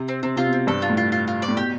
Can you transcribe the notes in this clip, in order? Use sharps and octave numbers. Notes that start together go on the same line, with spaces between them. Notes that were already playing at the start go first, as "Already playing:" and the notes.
Already playing: C3
C4
C3 C4
C3 F4
B2
C4
G2 A4
F4
A2
F4
F4
F4
D5
A2
B2 G4